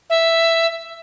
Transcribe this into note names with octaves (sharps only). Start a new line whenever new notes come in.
E5